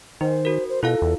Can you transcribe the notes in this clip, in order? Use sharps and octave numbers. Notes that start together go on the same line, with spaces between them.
D#3 D#4 C5
F#4 A#4
C5
B2 E4 F4 A4 F5
E2